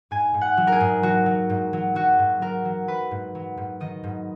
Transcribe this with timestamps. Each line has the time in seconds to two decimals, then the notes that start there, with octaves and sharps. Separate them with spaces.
0.11 G#2 G#5
0.34 G#2
0.41 F#5
0.57 F#3
0.67 A#4
0.72 G#4
0.80 G#2
1.03 F#3 F#4
1.26 F#3
1.50 G#2
1.73 F#3
1.95 F#3 F#4
2.19 G#2
2.41 F#3 A#4
2.65 F#3
2.88 F#3 B4
3.11 G#2
3.35 F#3
3.57 G#2
3.80 D#3 D#5
4.04 G#2